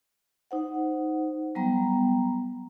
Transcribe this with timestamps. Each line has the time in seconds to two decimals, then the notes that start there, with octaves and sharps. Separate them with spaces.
0.51 D#4 C5 F#5
1.55 F#3 G3 B3 G5 A#5